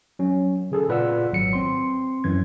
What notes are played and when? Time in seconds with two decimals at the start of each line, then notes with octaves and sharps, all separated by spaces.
0.19 F#3 C#4
0.71 C#3 G#4 A4
0.88 A#2 F4 B4 D5 F#5 E6
1.32 G#1 F#3 C#7
1.53 C4 C6
2.24 F#2 E3 G#6